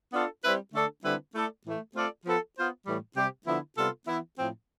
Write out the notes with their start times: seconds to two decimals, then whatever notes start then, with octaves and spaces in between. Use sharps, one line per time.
0.13 B3 D4 F4 A4
0.43 G3 C4 E4 B4
0.74 D3 A3 D4 A4
1.03 D3 G3 C4 E4 B4
1.34 A3 E4 A4 D5
1.65 A2 E3 A3
1.95 A3 C4 F4 A4 D5
2.26 F3 B3 F4 A4
2.56 B3 F4 C5
2.85 A2 E3 G3
3.16 C3 G3 C4 G4
3.47 D3 F3 B3 E4
3.77 C3 G3 B3 F4 A4
4.07 E3 B3 E4
4.37 A2 F3 C4